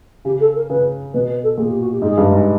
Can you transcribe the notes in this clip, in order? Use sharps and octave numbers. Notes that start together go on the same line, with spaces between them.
C#3 G4
A4
A#4
C#3 B4
B2 B4
B4
A4
A#2 G#4
G4
F#4
G4
G#2 G#4
G2
G#2